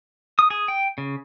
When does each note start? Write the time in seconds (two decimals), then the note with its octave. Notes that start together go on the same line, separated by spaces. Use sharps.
0.39 D#6
0.50 G#4
0.68 G5
0.98 C#3